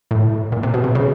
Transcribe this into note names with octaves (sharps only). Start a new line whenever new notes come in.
A2
A#2
C3
B2
C3
C#3